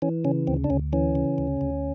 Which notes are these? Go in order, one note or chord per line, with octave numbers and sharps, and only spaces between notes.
E3 C#4
C#3 C#4
D2 C4
D4
D2 C#4
E3 C#4
C#3
D2
D2